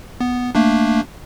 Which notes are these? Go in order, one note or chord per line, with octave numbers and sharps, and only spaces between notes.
B3
A3 A#3 D4